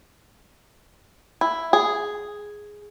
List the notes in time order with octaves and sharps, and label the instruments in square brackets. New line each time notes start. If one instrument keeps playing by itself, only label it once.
[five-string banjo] E4
G#4